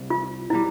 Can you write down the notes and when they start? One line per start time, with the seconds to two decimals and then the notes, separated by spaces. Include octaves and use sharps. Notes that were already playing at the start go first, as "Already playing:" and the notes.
Already playing: C2 C3
0.10 F4
0.50 B2 G3 E4